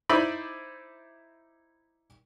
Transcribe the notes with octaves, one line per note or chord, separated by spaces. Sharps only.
D#4 E4 C5 D5 E5 B5